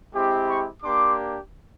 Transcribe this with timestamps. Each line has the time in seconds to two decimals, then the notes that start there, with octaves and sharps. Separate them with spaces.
0.13 G#3 C4 E4 G4
0.47 B5 C#6
0.82 A#3 D4 G4 C6 D6